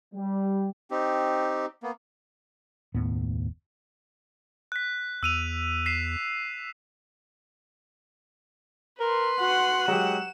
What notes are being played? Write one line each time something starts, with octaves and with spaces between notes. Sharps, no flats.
G3
C4 D#4 G4
A#3 B3
F#1 D#2 A2 B3
F#6 B6
E2 E6 D#7 F7
B6 C7 E7
A#4 B4 C6
F#4 F#5
F#3 G#3 G4 E7